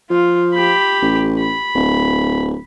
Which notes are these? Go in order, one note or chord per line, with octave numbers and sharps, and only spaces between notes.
F3 F4
G4 B5
A1
B5
D1